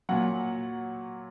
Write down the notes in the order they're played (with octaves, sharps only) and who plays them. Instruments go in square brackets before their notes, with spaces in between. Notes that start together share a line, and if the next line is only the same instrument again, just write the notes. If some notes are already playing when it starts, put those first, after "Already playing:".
[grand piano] A#2 F#3 F#5